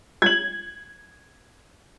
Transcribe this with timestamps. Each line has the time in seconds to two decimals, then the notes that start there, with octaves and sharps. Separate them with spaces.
0.22 G#6 F#7